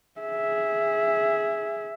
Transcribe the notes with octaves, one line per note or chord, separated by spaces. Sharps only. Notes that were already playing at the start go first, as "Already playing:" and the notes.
G#4 E5